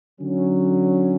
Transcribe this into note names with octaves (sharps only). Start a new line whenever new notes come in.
D3 F#3 C#4